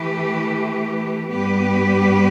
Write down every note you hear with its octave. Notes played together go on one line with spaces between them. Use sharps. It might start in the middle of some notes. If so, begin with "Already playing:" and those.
Already playing: E3 A3 G4 B4
G2 G3 B3 G4 B4